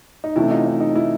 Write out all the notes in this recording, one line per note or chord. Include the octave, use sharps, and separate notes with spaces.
D#4
C3 E3 A3 C#4 E4
D#4 F4
D#4
D#4
E4